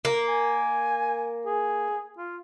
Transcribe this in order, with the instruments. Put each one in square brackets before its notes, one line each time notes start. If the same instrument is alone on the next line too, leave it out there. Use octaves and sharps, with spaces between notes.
[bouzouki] A#3
[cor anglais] G#5
G#4
F4